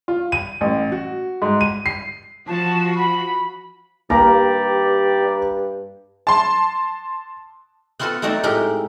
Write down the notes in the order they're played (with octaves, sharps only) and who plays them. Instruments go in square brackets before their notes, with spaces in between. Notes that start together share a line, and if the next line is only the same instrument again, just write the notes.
[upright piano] F4
D#7
A1
F#4
G#2
D#7
C7
[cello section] F3 F#4 [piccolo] A5
[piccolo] B5
[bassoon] G2 [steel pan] A#3 [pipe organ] G4 D5 [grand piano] A#5
[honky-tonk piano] A5 C6
[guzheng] B3 C4 F4 F#4 A4 B4
F#3 A3 C4 D#4 F#4 D5
A2 G#3 G4 A#4 G5